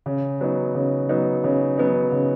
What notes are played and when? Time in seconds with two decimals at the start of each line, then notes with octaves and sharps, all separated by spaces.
0.06 C#3
0.41 F#3 B3 D#4
0.75 C#3
1.09 F#3 B3 D#4
1.44 C#3
1.78 F#3 B3 D#4
2.12 C#3